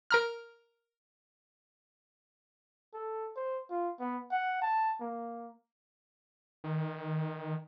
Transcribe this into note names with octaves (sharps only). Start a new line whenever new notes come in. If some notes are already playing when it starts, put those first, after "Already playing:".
A#4 A#5 F6
A4
C5
F4
B3
F#5
A5
A#3
D#3